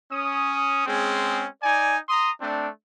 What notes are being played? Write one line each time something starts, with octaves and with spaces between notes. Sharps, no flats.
C#4 D#6
G#3 C4 C#4 G#4
D#4 D5 G#5
A#5 C6 D#6
A3 C4 D4